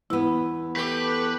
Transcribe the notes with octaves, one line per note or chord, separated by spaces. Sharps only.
E2 B3 E4
A3 G4 B4